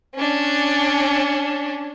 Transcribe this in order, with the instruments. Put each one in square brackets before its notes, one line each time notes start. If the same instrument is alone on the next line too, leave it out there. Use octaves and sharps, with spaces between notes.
[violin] C#4 D4